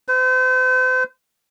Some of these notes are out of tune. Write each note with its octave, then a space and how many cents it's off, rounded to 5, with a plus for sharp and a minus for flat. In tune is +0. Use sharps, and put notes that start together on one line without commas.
C5 -40